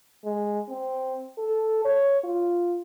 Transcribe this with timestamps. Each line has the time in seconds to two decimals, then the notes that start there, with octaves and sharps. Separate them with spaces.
0.25 G#3
0.69 C4
1.38 A4
1.85 C#5
2.24 F4